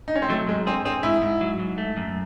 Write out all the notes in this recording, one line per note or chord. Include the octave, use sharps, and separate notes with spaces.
D#4
C#4
C4
F#3 A3
G#2 G#3
C4 G#4
C4 G#4
G#2 E4
G#2
F#3
G#2
A3
F#2